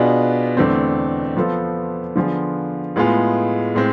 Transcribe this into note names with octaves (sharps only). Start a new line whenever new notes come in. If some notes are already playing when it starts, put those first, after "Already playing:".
Already playing: B2 B3 D4 F4 G#4
E2 D3 A3 C4
F3 B3 F4 A4 C5
D3 F3 B3 F4 G#4
A2 G#3 B3 F4 G#4
A2 G#3 C4